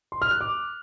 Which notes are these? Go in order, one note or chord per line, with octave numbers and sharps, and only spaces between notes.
C6
F6
F#6
D6